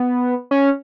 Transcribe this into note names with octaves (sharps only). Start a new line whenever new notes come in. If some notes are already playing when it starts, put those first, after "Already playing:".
Already playing: B3
C#4